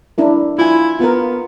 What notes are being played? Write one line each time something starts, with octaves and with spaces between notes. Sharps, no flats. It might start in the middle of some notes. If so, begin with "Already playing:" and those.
D4 E4 A#4
E4 F4 G#5
B3 F4 A#4